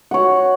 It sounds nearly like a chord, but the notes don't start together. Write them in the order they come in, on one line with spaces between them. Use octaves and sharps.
F#5 C#5 F#4